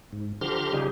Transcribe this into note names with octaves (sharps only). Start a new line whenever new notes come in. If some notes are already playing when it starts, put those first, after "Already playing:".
G#2
D3 F3 G4 A#5 C6 F6
C#3 F3 G3 D#4 G4 G#4